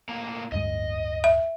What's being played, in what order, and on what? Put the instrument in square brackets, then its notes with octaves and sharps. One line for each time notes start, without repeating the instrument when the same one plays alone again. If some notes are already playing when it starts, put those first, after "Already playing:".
[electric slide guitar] A2 A#3 A#5
[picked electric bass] D1 G2 G#3 [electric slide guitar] D#5
[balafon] E5